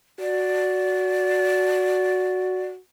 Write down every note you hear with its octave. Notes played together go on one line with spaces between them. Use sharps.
F#4 D5